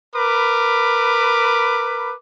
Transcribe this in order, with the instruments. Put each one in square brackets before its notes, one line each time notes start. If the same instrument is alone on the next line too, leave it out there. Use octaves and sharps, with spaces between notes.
[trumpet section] A#4 B4 B5 D6